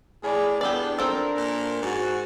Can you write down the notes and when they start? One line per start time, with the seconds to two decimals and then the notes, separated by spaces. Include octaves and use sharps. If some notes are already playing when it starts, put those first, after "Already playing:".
0.23 A2 G#4 D5
0.61 E2 B3 D4 G4 A4 D5
0.99 F3 C4 A4 A#4
1.37 A#2
1.82 G#2 F#4